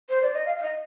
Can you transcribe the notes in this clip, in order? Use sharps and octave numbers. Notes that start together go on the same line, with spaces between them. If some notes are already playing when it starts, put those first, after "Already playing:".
C5
D5
D#5
F5
F5
D#5